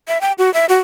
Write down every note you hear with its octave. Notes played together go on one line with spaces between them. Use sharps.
E5
G5
F#4
E5
F#4